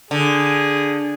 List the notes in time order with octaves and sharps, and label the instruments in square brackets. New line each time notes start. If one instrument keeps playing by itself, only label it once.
[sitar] D3 [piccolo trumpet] G#4